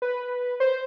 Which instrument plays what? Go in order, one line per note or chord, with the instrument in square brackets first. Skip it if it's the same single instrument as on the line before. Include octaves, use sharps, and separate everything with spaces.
[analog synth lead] B4
C5